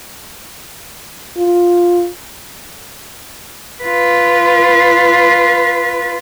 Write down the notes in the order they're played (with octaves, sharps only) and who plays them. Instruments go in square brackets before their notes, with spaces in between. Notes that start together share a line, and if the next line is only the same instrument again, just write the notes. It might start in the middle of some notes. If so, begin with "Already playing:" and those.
[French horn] F4
[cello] F4 B4